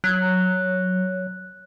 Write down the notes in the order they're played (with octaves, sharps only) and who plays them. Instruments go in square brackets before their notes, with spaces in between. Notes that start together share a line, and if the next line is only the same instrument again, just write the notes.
[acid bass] F#3 [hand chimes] F#6